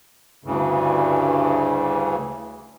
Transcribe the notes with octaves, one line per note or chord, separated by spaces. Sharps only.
D2 G2 C#3 E3